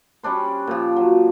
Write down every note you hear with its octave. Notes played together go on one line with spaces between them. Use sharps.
G3 C#4 D4 C5
A#2 F3
F#3